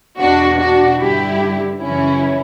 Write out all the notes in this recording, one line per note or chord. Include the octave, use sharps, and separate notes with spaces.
E2 B2 D4 F#4
D4 F#4
G2 D3 E4 G4
F#2 C#3 E3 C#4 E4